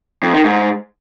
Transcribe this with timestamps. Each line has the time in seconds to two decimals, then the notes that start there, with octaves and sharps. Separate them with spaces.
0.23 F2
0.34 D#3
0.44 G#2